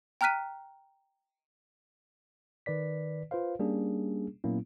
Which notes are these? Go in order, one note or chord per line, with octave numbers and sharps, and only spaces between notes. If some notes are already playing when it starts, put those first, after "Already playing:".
G5 A#5 F6 F#6 B6 D#7
D#3 B4 D5 B6
F4 B4 C5 F5
G3 A#3 C#4 D4 G#4
A#2 F#3 A#3 B3 C#4 E4